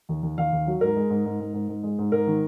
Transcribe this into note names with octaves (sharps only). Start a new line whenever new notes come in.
D#2
D#2
D#2 F5
D#2
F#3
G#2 A#4
G#3
G#2
G#2
G#2
G#2
G#2
G#3
G#2
G#2 A#4
D#3